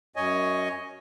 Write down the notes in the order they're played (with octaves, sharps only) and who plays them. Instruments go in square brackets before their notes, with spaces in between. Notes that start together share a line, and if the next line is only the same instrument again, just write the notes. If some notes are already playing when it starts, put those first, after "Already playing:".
[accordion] F#2 C#5 D#5 G#5